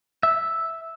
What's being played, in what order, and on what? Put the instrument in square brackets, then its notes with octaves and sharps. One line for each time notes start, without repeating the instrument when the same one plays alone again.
[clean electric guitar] E5